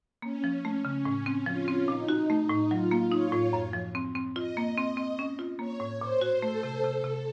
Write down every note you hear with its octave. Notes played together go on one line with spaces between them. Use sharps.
A#3 C#4
F3
A3 C#4
C#3
A2 C#4
C4
F3 F4
C4
A#2 D#4
F#4
A3
A2
F#3 F4
A#3
D#4 C#5
A2
F#2
F3
C4
C4
F4 D#5
A#3
C4 D#5
C4
C#4
F4
A#3 C#5
A2
A#2 C5
F#4
A3 A4
C3
C3 A4
C3